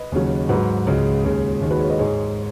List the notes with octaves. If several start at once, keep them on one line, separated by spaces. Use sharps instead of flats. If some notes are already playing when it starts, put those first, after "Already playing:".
Already playing: B4 D#5
D#2 C#3 F#3
G#2 F#3 F#4 B4
C#2 C#3 G#3
D#2 C#3 G#3
D#2 D#3 G#3
F#4 B4
G#4 C#5
B4 D#5
G#2 G#3 G#4 C#5